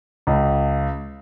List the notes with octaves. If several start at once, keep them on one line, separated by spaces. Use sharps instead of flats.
C#2